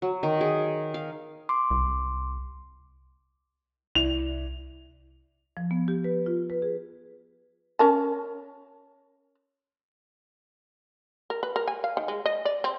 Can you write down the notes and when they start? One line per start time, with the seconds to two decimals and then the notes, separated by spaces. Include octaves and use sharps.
0.02 F#3
0.23 D#3
0.41 G#4
0.94 F5
1.49 C6 D6
1.71 C2
3.95 C2 E4 D5 F7
5.57 F3
5.71 B3
5.88 G4
6.04 B4
6.26 F4
6.50 B4
6.62 G#4
7.79 C#4 A#4 A5
11.30 A#4
11.43 B4
11.56 A#4
11.68 G#5
11.84 F5
11.97 D#3
12.08 G#3
12.26 D#5
12.45 D5
12.64 C4